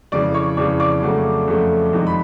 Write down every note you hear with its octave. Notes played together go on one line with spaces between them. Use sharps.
F2 C#3 E3 D5 D6
C#5 C#6
F2 C#3 E3 D5 D6
D5 D6
F2 C#3 F#3 A3
F2 C#3 F#3 A3
F2 C3 D#3 G#3
B5